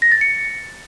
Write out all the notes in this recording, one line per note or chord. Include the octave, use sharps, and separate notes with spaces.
A#6
A6
C#7